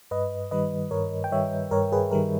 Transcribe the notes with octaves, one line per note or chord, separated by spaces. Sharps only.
G2 B4 D#5
D#3 G3 B4 D#5
G2 A#4 C#5
G5
D#3 G3 C#5 E5
G2 A#4 C#5
G#4 B4
D#3 G3 A#4